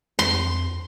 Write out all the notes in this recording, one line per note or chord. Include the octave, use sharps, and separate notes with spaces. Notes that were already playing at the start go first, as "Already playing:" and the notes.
F2 C6